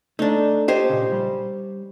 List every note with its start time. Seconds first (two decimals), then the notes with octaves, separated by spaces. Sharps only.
0.19 A3 D4 D#4
0.68 G4 C5 C#5 D#5
0.89 A#2 C#3
1.12 G3